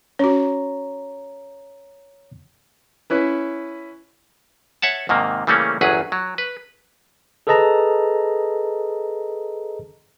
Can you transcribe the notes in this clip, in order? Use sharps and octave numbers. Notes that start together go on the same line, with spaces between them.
C#4 F#4 C#5 A#5
C#4 E4 B4
C#5 E5 F#5 A5
G#2 C3 D#3 A#3
C#3 E3 G3 A3 A#3 C#4
G1 E2 F#3 G#4 B4
F#3
B4
G#4 A4 B4 D#5 A5 A#5